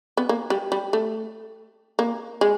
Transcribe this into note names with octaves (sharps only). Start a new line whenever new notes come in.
B3
A#3
G3
G3
A3
A#3
G#3